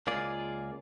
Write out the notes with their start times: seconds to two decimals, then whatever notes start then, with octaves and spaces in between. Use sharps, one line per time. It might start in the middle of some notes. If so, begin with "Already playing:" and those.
0.07 C#2 A#3 F4 G#4 D5